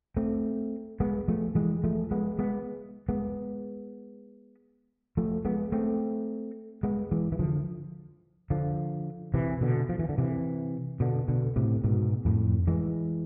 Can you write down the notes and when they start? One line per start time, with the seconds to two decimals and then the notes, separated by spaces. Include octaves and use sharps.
0.17 A3 C4
1.00 G#3 B3
1.28 F3 A3
1.55 E3 G#3
1.84 F3 A3
2.11 G#3 B3
2.39 G#3 B3
3.09 G#3 B3
5.17 F3 A3
5.45 G#3 B3
5.72 A3 C4
6.83 G#3 B3
7.11 E3 G#3
7.32 E3
7.39 D3 F3
8.50 D3 F3
9.34 C3 E3
9.61 B2 D3
9.89 F3
9.99 E3
10.09 D3
10.18 C3 E3
11.00 B2 D3
11.28 B2 D3
11.56 A2 C3
11.84 G#2 B2
12.25 F2 A2
12.67 E3 G#3